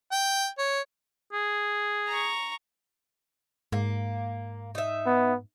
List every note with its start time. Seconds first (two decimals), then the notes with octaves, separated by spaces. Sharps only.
0.12 G5
0.58 C#5
1.33 G#4
2.08 A#5 C#6
3.72 G#2 A#3
4.75 D#4 E5
5.06 B3